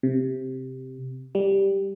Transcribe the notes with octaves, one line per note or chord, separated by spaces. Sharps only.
C3
G3